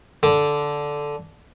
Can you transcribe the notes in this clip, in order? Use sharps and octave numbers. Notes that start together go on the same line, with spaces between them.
D3